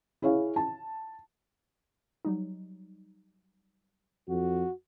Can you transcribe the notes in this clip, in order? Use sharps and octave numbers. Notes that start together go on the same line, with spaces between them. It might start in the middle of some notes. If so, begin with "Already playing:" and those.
E4 G#4 C#5 F5
A5
F#3 G3 D#4
F2 F#4